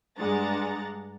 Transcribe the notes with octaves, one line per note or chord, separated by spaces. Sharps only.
G2 G#3 D4 F#5 A#5 A6